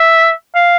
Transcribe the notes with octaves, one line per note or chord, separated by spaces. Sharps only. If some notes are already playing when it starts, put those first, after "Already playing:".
Already playing: E5
F5